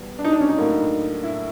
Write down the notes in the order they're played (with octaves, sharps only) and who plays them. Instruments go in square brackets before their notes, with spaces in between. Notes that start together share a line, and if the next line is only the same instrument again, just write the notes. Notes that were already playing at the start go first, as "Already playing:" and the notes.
Already playing: [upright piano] E2 B2 G3 B3 E4
[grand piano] D4
D#4
D4
C#4
D#4
[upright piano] A2 F#3 A#3 D4 F4
[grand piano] E4